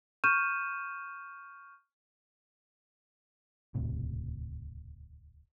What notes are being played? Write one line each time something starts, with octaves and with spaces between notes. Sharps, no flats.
C#6 F6 G6 D#7 E7
D#1 C#2 A2 C3